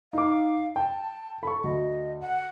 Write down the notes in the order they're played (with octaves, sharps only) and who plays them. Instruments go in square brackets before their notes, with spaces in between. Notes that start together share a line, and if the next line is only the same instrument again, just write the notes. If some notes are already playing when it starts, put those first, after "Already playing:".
[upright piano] D#4 D6 [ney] F5
[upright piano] G5 [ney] A5
[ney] A4 [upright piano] B5 C#6
[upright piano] D2 [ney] D#5
[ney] F#5